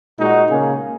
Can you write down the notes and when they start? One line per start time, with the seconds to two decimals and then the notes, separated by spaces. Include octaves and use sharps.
0.18 A#2 G#3 D#4 F#4
0.49 C#3 A#3 C#4 G#4